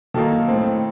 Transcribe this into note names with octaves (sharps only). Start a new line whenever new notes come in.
D#3 F#3 A#3 D#4 A4
A2 A3 C4